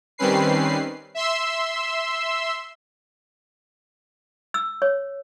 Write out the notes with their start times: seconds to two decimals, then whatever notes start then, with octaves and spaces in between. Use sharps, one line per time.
0.18 D#3 G3 C4 C#4 B4 C7
1.15 E5 C6 E6
4.54 E6
4.82 C#5